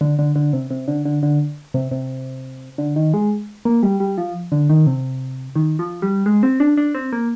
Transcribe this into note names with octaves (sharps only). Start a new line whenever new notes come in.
D3
D3
D3
C3
C3
D3
D3
D3
C3
C3
D3
D#3
G#3
A#3
G3
G3
F3
D3
D#3
C3
D#3
F3
G3
G#3
C4
D4
D4
C4
A#3